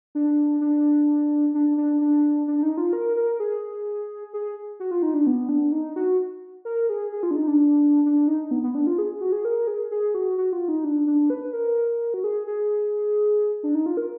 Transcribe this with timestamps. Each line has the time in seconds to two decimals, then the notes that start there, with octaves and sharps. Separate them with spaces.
0.15 D4
0.61 D4
1.54 D4
1.77 D4
2.01 D4
2.48 D4
2.58 D4
2.63 D#4
2.77 F4
2.93 A#4
3.17 A#4
3.40 G#4
4.33 G#4
4.80 F#4
4.91 F4
5.03 D#4
5.14 D4
5.27 B3
5.49 D4
5.72 D#4
5.96 F#4
6.65 A#4
6.89 G#4
7.12 G#4
7.23 F4
7.31 D4
7.35 D#4
7.47 D4
8.06 D4
8.28 D#4
8.51 B3
8.63 B3
8.75 D4
8.87 F4
8.98 G#4
9.21 F#4
9.32 G#4
9.45 A#4
9.67 G#4
9.91 G#4
10.15 F#4
10.38 F#4
10.53 F4
10.68 D#4
10.84 D4
11.07 D4
11.30 B4
11.53 A#4
12.14 F#4
12.24 G#4
12.47 G#4
13.63 D4
13.75 D#4
13.86 F4
13.97 A#4